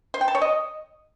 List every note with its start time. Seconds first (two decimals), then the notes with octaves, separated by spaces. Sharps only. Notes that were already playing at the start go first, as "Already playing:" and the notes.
0.14 C5
0.21 G5
0.28 A5
0.35 C#5
0.42 D#5